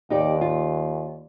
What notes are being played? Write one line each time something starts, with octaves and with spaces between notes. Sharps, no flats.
D#2 D#4 G4 D5
F4